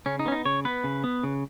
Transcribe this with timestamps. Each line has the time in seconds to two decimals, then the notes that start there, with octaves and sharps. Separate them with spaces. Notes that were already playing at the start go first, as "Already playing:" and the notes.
0.06 C#3 C#4
0.19 D#4
0.26 B3 C#4
0.32 D#4
0.45 C#3 C#5
0.65 B3 B4
0.84 C#3
1.04 B3
1.23 C#3